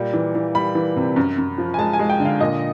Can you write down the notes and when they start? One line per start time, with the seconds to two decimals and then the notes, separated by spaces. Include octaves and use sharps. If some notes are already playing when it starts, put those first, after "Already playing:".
Already playing: A#2 G3
0.14 E3
0.35 E3
0.55 G3 B5
0.75 E3
0.96 C3
1.16 F#2
1.38 F#2
1.58 F3
1.74 G#5
1.78 G#3 A5
1.93 G#5
1.99 G#3
2.10 G5
2.20 D3
2.25 F5
2.40 A#2 D#5